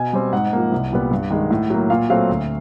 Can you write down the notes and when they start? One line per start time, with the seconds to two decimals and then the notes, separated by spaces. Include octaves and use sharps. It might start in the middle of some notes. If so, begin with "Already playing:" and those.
Already playing: B2 G#5
0.13 G3 C4
0.33 G#2 F#5
0.53 F3 A#3
0.72 C2
0.92 A#2 G3 B3
1.11 G2
1.30 D#3 G#3
1.50 A2
1.70 F#3 A#3
1.90 A#2 F5
2.10 F#3 A3 C4 F5
2.29 D2